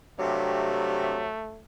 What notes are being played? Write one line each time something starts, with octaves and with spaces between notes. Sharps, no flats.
G2 C3 F#3 A3